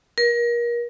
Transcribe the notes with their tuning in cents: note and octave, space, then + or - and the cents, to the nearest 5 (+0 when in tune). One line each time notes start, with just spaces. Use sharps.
A#4 +30